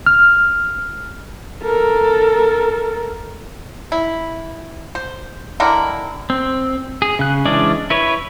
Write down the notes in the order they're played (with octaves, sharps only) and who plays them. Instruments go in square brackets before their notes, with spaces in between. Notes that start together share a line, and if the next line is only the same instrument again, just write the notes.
[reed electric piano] F6
[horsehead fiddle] A4 A#4
[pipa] E4
C5
D3 D#3 E4 A#4
[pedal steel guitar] C4
G#4
C#3 F#6
E3 G#3 C#4 D4 D5
E4 B4 C#5